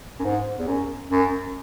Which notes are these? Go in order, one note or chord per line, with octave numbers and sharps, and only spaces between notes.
F#2
G#2
E2
F#2
F#2